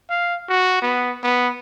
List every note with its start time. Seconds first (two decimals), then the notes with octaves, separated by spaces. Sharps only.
0.10 F5
0.49 F#4
0.82 B3
1.23 B3